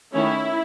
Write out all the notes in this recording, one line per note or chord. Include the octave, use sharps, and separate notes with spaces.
D#3 A3 C#4 E4